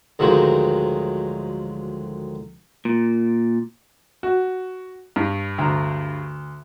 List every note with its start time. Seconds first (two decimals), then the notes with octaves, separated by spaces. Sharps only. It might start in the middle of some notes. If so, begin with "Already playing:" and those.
0.19 D2 G#2 D#3 F3 F#3
2.85 A#2
4.23 F#4
5.16 G2
5.58 D2 A#5